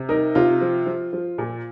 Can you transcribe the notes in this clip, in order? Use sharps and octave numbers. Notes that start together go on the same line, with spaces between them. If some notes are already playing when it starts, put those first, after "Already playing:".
Already playing: C3
D#4 A#4
C3 F4
F3
F3
F3
A#2